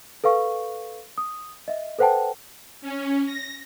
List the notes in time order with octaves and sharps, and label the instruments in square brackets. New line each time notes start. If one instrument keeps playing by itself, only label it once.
[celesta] A4 B4 F5 C#6
D#6
D#5 E5
A4 B4 C5 F#5 G5 A5
[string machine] C#4
A#6